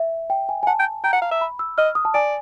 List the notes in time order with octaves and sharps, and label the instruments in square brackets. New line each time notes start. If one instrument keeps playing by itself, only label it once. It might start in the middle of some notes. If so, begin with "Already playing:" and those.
Already playing: [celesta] E5
G5
G#5
G#5
[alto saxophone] F#5 [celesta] A5
[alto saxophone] G5
[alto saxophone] G5 [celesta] A#5
[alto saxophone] F#5
F5
E5
[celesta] B5
E6
[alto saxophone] D#5 [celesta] F6
[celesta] D#6
A5
[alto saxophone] D5 [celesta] G#5